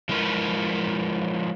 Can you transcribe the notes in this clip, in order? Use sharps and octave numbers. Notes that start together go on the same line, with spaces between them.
F3 G#3 E4 A#4 B4